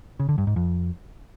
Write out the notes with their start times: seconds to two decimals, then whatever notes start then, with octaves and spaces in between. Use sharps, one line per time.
0.20 C#3
0.29 D3
0.38 G2
0.47 G#2
0.56 F2